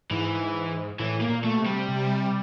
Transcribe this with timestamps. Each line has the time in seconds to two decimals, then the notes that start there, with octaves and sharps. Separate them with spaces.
0.11 G#2 E3
0.99 A2 E3
1.21 A#3
1.29 A#2
1.44 A3
1.53 B2
1.59 C3
1.66 G3
1.88 C3